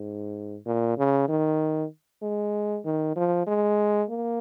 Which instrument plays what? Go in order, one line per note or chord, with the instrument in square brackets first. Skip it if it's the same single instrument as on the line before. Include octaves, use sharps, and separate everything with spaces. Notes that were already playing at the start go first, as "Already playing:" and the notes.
Already playing: [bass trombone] G#2
A#2
C#3
D#3
G#3
D#3
F3
G#3
A#3